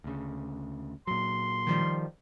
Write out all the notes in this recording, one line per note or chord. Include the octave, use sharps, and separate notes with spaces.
D2 C#3
A#2 F#3 C6
D#3 F3 G3